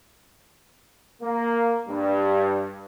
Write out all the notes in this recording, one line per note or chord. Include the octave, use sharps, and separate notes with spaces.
A#3
G2